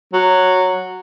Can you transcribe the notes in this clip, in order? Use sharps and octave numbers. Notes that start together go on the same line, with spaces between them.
F#3